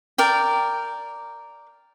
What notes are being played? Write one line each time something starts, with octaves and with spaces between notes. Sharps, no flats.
A#4 D5 G5